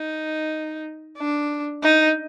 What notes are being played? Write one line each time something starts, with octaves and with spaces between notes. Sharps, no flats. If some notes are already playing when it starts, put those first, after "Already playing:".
Already playing: D#4
D4
D#4